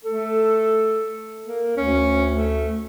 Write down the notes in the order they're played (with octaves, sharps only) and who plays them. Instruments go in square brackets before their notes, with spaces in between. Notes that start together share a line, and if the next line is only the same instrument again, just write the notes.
[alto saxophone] A3 [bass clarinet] A4
[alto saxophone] A#3
[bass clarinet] D2 [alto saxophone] C#4
[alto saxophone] A3